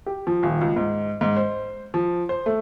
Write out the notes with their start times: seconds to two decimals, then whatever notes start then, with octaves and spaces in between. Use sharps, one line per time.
0.06 G4
0.27 F3
0.43 D#1
0.61 C#2
0.76 G#2
1.21 G#2
1.36 C5
1.94 F3
2.29 C5
2.46 A3